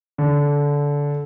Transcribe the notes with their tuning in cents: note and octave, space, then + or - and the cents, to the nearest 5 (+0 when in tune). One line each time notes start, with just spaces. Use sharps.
D3 -20